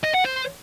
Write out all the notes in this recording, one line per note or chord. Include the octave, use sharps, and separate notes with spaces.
D#5
F#5
C5